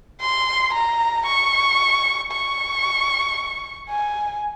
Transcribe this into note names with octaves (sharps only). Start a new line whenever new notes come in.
C6
A#5
C#6
C#6
G#5